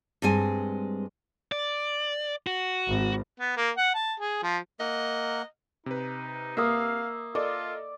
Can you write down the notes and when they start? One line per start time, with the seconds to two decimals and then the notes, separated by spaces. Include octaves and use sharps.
0.22 G2 G#3 C4 G#5
1.52 D5
2.47 F#4
2.87 G#1
3.40 B3
3.57 A#3
3.77 F#5
3.95 A5
4.20 G#4
4.43 F3
4.80 A#3 A#4 D#5 F#5
5.86 C3 D#4 B4
6.57 A#3 E5 F5 D#6
7.35 F4 A4 A#4 D5 D#5